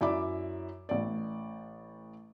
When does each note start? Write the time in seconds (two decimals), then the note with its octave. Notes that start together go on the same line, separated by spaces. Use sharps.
0.01 F#2 E4 D5 E5 D6
0.89 A1 D5